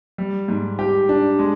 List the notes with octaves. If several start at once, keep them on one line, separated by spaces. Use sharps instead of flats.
G3
G#2
G4
D4
G#3